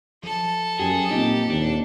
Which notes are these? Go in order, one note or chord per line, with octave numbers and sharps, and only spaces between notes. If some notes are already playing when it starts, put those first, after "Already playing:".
F3 A4 A5
F#2 G4 G#4
A#2 C4 D#4 G4
D#2 D4